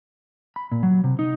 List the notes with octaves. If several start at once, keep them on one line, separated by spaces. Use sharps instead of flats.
B5
A#2
F#3
C3
D#4